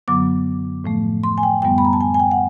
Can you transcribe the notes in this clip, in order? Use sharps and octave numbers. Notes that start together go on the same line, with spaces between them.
F#2 D3 F#3 B3 D6
A2 F3 A3
C6
G#5
G5
F#2 D3 G3 B3 G5
B5
A#5
A5
G#5
G#5
G5
F#5